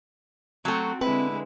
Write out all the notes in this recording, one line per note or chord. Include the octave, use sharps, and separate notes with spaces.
F#3 A3 C4 F#4
D3 G#3 C4 E4 B4